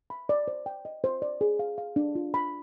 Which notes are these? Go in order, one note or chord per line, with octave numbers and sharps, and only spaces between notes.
B5
D5
C5
G5
D#5
C5
D5
G#4
F5
F5
D4
F4
B5